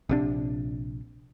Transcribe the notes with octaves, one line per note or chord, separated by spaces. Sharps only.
A#1 C3 D4